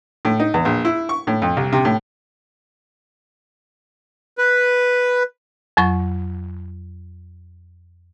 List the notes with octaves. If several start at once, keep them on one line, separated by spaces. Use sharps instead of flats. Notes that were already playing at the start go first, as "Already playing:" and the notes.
A2
D#4
E2
A#1
E4
C#6
A2
F2
C2
C3
A2
B4
F2 F#3 C#6